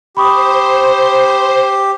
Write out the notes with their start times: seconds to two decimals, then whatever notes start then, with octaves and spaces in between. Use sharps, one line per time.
0.17 G4 C5 B5 C#6 D#6